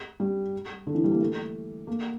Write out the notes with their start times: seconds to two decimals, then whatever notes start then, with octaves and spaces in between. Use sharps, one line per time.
0.20 G3
0.87 D3
0.95 E3
1.04 G3
1.11 A#3
1.20 A3
1.87 A#3